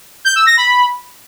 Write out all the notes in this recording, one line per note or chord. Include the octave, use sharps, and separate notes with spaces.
G6
E6
A#6
B5